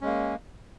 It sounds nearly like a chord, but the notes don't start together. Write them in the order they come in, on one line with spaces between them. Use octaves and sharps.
C#4 G#3 A#3